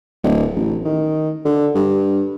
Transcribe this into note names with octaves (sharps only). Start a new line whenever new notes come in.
D1
A1
D#3
D3
G2